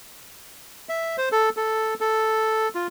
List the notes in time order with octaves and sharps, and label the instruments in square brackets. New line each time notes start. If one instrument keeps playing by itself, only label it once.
[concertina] E5
C5
A4
A4
A4
F4